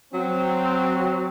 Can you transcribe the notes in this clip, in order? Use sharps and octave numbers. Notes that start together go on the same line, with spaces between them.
F#3 C4